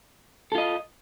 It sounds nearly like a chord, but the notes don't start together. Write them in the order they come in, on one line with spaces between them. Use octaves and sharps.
A4 F4 D#5